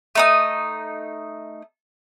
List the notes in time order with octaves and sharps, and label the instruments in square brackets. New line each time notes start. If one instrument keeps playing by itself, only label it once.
[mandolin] A3 D#4 D#6